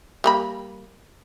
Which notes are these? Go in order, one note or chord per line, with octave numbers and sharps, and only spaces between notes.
G3 A#3 B5